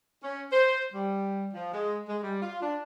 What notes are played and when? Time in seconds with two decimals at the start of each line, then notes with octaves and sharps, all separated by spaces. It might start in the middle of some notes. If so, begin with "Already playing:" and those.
0.23 C#4
0.52 C5
0.94 G3
1.53 F3
1.73 G#3
2.08 G#3
2.23 G3
2.42 F4
2.62 D4